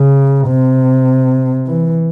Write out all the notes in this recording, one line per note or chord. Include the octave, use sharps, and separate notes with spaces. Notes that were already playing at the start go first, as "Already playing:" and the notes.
Already playing: C#3
C3
E3